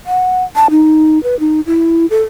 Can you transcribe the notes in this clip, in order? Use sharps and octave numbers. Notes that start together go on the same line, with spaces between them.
F#5
A5
D#4
B4
D#4
E4
A4